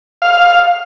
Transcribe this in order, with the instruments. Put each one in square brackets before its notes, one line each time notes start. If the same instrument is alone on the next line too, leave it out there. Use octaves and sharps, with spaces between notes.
[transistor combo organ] F5